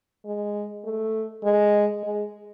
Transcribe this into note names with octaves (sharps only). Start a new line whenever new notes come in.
G#3
A3
G#3
G#3